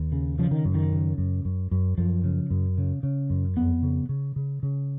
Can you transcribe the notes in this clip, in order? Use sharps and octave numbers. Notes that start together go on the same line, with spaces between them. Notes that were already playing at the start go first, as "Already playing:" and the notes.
Already playing: D#2
C#3
C#3 F3
D#3
F#2
D#3
C#3
F#2
F#2
F#2
F#2 F3
C#3
F#2
C#3
C#3
F#2
F2 B3
C#3
C#3
C#3
C#3